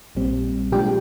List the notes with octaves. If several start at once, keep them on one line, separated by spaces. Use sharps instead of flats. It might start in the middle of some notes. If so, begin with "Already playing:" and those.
A#1 A#2 G3 C4
A#2 F3 G#3 D4 G4 G5